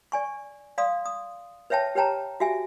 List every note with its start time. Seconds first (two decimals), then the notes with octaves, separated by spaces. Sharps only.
0.12 D5 G#5 C#6
0.78 D5 F5 C6 D#6
1.06 D#6
1.70 B4 C#5 E5 G5 A5
1.95 G4 B4 C#5 G5 A5 A#5
2.40 F#4 G4 E5 G#5